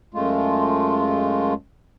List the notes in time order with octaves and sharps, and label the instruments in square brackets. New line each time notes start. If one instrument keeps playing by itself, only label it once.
[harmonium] F#2 G#3 A3 F4